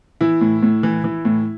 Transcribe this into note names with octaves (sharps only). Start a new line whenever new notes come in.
E3 E4
A2
A2
E3
E3
A2